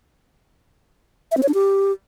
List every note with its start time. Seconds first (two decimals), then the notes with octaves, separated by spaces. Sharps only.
1.31 E5
1.37 C4
1.43 C#5
1.48 D4
1.54 G4